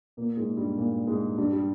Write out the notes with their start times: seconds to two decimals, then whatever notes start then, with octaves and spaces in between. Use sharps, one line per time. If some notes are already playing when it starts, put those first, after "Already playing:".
0.17 A#2 A#3
0.37 G#2 G#3
0.57 G2 G3
0.77 A#2 A#3
1.07 G#2 G#3
1.38 G2 G3
1.53 G3